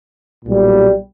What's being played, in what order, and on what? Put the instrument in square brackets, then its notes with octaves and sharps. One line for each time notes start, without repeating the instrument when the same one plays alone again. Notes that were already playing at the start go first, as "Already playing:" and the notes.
[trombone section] B1 A#2 G3